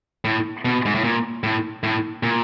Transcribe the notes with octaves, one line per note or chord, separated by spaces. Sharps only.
A2
B2
G#2
A2
A#2
A2
A2
A#2